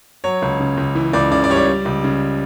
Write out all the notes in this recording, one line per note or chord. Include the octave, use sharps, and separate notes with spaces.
F#3 C#5
C#2
C#3
C#2
E3
C#2 D5
C#3 D5
D5
G3 C#5
D5
G3
C#2
C#3